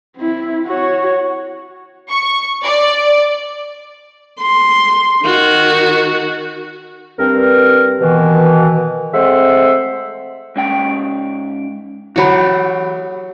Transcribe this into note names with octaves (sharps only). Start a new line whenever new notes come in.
C4 E4
F#4 C#5
C#6
D5
C6
D#3 F#4
G2 C4 A#4
B2 D#3 E3
G#3 A3 C4 C5 E5 F#5
G#2 C#4 G5
E3 F#3 F#4 G4 B5